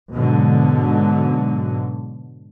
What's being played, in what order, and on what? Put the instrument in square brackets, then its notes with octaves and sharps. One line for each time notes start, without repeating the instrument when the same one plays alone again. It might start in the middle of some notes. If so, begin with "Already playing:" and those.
[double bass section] G#2 B2 D3 F#3